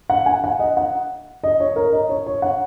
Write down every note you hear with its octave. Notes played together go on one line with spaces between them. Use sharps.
F#5
G#5
F#5
D#5
F#5
D#5
C#5
A#4
D#5
C#5
C#5
F#5